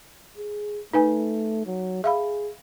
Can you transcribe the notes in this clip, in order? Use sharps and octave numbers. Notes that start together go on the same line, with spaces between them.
G#4
A3 D#4 B4 G#5
F#3
G#4 E5 F5 B5